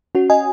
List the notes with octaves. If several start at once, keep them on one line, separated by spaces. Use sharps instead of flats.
C#4 F#4
D#5 G#5